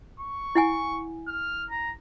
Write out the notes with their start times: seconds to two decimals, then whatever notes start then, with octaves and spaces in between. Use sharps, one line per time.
0.20 C#6
0.55 E4 F#5 G#5
1.28 F6
1.70 A#5